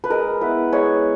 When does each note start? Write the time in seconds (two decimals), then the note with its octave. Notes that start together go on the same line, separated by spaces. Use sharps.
0.04 B4
0.10 G#3 A#4
0.41 B3 E4 B4
0.72 G#3 C#5